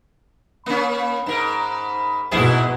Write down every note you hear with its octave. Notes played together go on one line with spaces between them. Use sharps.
A#3 C#4 B5
G#2 A#4
G#2 B2 E4 G#4